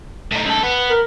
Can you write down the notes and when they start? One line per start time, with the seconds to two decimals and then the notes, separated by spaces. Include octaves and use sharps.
0.32 A2 D#4
0.45 C#2 A4
0.63 B3
0.90 A#4